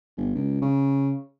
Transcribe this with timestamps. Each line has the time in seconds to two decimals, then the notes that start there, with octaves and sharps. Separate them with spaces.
0.17 G1
0.35 C#2
0.62 C#3